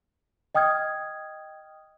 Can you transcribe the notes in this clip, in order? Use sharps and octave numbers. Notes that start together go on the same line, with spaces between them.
D#5 G5 D#6 F6 G#6